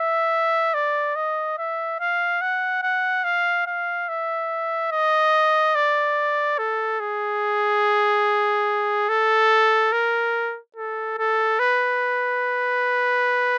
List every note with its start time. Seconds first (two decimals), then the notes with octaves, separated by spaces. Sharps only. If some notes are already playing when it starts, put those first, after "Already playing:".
Already playing: E5
0.74 D5
1.16 D#5
1.58 E5
2.00 F5
2.41 F#5
2.83 F#5
3.24 F5
3.67 F5
4.09 E5
4.92 D#5
5.75 D5
6.58 A4
7.00 G#4
9.09 A4
9.92 A#4
10.76 A4
11.18 A4
11.59 B4